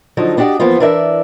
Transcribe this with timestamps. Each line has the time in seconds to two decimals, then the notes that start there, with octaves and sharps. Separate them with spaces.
0.17 D3 F3 F#3 D#4
0.37 B3 D4 F#4 G4 D5 D#5
0.60 E3 F3 A#3 B3 F4
0.80 E3 D4 A#4 D5 E5